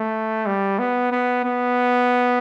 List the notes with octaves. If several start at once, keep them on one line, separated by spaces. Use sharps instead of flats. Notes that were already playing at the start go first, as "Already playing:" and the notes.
Already playing: A3
G3
B3
B3
B3